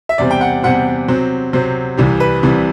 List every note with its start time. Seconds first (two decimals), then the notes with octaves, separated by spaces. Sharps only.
0.09 E5
0.18 E2 C3 G3 C4 D5
0.31 G5
0.41 F#5
0.63 E2 C3 G3 C4 F#5
1.08 C3 F#3 C4
1.53 C3 F#3 C4
1.97 C2 C3 E3 G3
2.20 B4
2.43 C2 C3 E3 G3